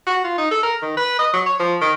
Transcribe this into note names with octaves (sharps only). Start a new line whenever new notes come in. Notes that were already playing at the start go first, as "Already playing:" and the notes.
F#4
F4
D#4
A4
A#4
D#3
B4
D#5
F#3
C#5
F3
D#3